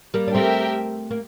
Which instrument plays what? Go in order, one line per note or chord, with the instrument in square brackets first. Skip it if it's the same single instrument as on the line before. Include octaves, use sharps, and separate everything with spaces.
[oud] G3 A#3
D4
[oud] A3 C4 [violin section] G4 A#4 E5 G5
[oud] A#3